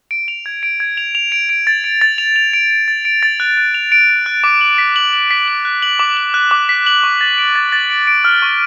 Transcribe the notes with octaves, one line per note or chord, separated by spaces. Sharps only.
D7
F7
G#6
D7
G#6
F7
F7
D7
D7
A6
D7
A6
F7
F7
D7
D7
A6
D7
A6
F#6
F#6
F7
D7
A6
F#6
D6
F#7
B6
F#7
F#7
B6
F#7
F#6
F#7
D6
F#7
F#6
D6
B6
F#7
C#6
A6
D7
A6
A6
D7
D7
F6
C#6